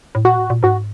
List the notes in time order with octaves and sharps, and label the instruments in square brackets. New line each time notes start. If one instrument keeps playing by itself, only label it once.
[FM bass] A2
[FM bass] A#2 [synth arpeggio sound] F#4
[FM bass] A2
A#2
[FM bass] G#2 [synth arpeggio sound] F#4